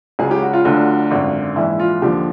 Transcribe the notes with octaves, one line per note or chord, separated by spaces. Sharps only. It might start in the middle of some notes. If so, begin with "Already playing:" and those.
C#2 C#3 F#3 G#4
G4
F#4
F4
D2 D3 F#3
G#1 F#2 D3
A#1 G#2 E3 E4
F4
D#2 D3 F3 G4